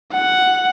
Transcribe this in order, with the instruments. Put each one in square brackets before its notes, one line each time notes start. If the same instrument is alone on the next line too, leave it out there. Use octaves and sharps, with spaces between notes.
[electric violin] F#5